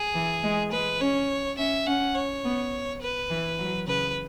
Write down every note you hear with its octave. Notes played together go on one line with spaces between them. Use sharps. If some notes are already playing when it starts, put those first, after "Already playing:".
Already playing: G#4
E3
G#3
G#3 B4
C#4 C#5
C#4 E5
C#4 F#5
C#5
B3
B4
E3
F#3
C#3 B4